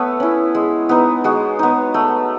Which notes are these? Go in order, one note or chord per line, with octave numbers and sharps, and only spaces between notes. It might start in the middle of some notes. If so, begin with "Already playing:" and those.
Already playing: A3 B3 B4 C#5 E5
C#4 E4
G#3
B3 D#4
G#3 F#4
B3 D#4
A3